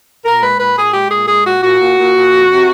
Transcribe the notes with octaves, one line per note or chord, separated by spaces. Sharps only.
A#2 A#4
G#3 B4
A#2 B4
A#2 G#4
G#3 G4
A#2 G#4
G#3 G#4
A#2 F#4
A#2 F#4
A#2
A#2
A#2
F2
C3